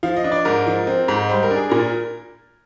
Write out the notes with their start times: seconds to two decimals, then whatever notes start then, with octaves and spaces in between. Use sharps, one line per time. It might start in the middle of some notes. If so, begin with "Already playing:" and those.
0.03 F3 F5
0.17 D#5
0.24 D4
0.32 D5
0.45 G#2 A#4
0.67 F3
0.87 C4
1.08 G#2
1.29 G3 C5
1.43 A#4
1.51 D4
1.56 G#4
1.69 A#2 A#4